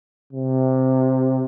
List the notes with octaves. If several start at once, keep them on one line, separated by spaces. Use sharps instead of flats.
C3